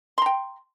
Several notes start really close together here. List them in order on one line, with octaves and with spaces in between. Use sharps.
C6 A#5 G5